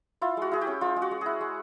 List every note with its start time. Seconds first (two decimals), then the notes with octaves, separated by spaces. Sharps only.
0.22 E4 F4
0.37 G#3 F#4
0.52 E4 G#4
0.61 G4
0.67 C#4
0.81 G#3 F4
0.96 G#3
1.02 F#4
1.11 G#3
1.21 E4 G#4
1.41 G#3